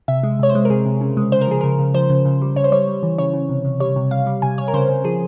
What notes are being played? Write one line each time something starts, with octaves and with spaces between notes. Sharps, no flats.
C3 E5
G#3
C3 C#5
C5
G#3
A#4
C3 G#4
C3
C#3
G#3
C#3 C5
A#4
F3 G#4
C#3 A#4
C#3
F3 C5
C#3
C#3
G3
C#3 C#5
C5
G3 C#5
G3
E3
C#3 C#5
C#3
C3
C3
G3 C#5
C3
G3 F5
G3
C3 G#5
C3 C#5
A#4
C#3 C5
C#3
F3 G#4